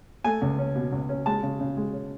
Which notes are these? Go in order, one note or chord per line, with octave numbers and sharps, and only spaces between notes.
A3 G#5
C#2
C#4
B2
C#2
C#4
G#3 A5
C#3
C#3
G#3
C#4